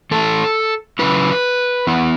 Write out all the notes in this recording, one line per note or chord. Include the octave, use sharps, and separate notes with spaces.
E3 A3 E4 A4
C#3 F#3 C#4 E4 B4
E3 B3 E4